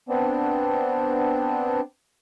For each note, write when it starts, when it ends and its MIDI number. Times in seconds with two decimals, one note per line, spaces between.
0.09 1.80 59
0.09 1.80 60
0.09 1.80 62